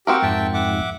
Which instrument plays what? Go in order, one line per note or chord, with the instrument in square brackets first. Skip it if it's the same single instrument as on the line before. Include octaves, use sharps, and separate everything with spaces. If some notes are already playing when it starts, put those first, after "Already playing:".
[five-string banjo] C4 F#4 A#4 [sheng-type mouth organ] G4
[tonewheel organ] F2 G#2 [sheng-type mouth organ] E5 G5 A5
[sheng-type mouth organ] E5 F#5 D6